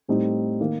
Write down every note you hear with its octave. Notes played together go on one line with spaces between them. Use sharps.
A2 G3 C4 D#4
D#3 A#3 D#4